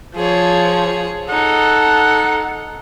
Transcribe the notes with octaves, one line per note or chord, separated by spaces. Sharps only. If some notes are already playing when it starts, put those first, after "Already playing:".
F3 G#4 C#5
D#4 A4 F#5